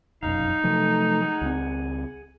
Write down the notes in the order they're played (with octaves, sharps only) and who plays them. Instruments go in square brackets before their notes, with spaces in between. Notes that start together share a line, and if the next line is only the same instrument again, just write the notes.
[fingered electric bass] F1 B1 F#2 [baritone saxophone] D#4 [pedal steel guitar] F5
[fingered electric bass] C3 F3 F#3 [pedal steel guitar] A3
[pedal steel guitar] G#4 F#5
[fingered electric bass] C#2 G3 C4